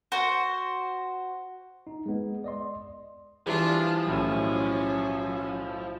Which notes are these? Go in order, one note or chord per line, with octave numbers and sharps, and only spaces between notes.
F#4 C5
D#4
G#3 B3
D5 D#5 C6
E3 F3 G3 D4 F4
B1 A2 C#4